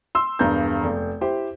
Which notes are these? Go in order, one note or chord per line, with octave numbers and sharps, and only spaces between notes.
C6 E6
E1 G2 A#5 G6
F1
E4 G4 C5